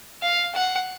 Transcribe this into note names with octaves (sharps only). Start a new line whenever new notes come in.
F5
F#5